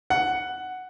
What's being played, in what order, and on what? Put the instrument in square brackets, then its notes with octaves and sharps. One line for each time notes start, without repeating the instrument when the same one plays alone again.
[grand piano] F#5